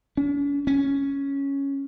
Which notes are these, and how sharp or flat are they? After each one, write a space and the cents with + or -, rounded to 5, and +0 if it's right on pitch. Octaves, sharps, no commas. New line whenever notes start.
C#4 +40
C#4 +0